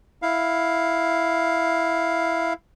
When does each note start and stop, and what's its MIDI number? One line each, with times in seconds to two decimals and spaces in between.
0.22 2.53 64
0.22 2.53 77